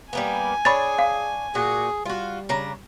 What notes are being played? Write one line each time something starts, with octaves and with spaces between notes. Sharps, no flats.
G3 A#3 B3 G#5
D4 G#4 C#5 B5 A6
F5
A#2 F#4 G#4
G3 F4 F#4
C#3 D4 A#5